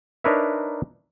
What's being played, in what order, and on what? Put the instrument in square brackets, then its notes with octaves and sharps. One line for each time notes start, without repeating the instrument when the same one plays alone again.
[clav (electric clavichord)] D4 D#4 A#4 B4 C#5 E5